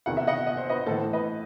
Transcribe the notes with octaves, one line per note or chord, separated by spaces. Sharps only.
E2 C3 D#3 F#5
E5
D#5 F#5
D#5
C5
B4 D#5
A2 E3 A4 C5
B4 D#5